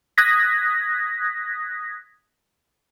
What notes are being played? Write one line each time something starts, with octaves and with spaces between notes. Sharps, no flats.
D#6 F#6 G#6 A#6 B6